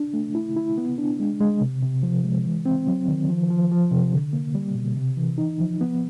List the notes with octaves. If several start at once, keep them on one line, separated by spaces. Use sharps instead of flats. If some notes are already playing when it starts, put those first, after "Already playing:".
Already playing: D4
A3
E4
E4
B3
D4
G#3
G#3
C3
C3
F3
G#3
E3
C4
F#3
D#3
F3
F3
F3
C3
D3
A#3
G3
B2
C3
E3
D#4
F3
B3